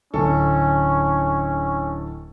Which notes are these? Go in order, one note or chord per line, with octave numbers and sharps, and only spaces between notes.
D1 D3 C#4 A4